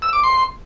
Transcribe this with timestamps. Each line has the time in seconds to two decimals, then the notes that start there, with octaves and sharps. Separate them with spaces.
0.02 E6
0.13 D6
0.23 C6